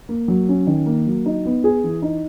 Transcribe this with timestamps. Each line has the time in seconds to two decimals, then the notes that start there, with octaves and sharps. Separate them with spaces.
0.09 A#3
0.28 F#3
0.49 C#4
0.67 D#3
0.86 A#3
1.06 F#3
1.26 D#4
1.45 B3
1.64 G#4
1.84 E3
2.02 D#4